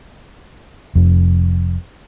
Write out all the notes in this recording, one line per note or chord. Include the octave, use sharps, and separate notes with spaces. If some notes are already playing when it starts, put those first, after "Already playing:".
F1 F2